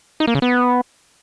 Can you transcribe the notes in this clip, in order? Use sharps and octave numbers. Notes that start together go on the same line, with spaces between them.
D#4
A#3
C#3
B3